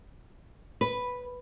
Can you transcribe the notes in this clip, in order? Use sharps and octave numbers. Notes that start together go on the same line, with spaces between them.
B4